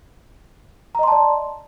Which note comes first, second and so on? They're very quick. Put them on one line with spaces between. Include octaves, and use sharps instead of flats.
A#5 D#5 C6 A5 D5